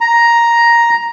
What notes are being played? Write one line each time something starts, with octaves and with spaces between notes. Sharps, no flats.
A#5